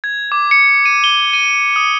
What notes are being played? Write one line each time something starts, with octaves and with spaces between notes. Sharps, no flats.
G#6
D6
C#7
D#7
G7
D#7
D#6